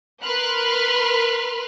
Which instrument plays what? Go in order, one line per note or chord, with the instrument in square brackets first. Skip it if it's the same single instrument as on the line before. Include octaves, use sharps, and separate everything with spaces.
[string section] A#4 B4 B5 C6 F6 F#6